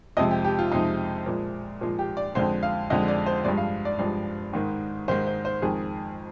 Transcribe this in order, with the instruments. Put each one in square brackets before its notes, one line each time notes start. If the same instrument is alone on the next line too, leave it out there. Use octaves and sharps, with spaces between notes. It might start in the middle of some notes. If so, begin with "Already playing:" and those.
[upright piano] F2 C3 F3 G#3 D#5
G4
G4
F4
F2 C3 F3 G#3 D#4
A#2 F3 G#3
A#2 F3 G#3
G4
D5
F2 D3 G#3 C5
F5
F2 D3 G#3 D#5
D5
C5
G2 F3 G#3 D5
F5
D5
G2 F3 G#3 D5
G#2 D#3 G#3
G#2 D#3 G#3 C5
C5
C5
F2 D#3 G#3 G#4